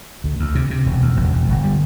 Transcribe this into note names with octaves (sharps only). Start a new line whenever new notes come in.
D2
D2
C3
C3
E1
D2
E1
E1
G1
G3